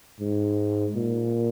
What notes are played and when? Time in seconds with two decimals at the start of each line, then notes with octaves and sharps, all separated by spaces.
0.20 G#2
0.96 A#2